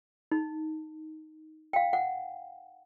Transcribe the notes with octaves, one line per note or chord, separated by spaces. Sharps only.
D#4
F5 G5
F#5